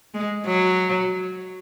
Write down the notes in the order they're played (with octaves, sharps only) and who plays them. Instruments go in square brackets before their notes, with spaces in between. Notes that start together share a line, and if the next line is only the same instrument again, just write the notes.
[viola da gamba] G#3
F#3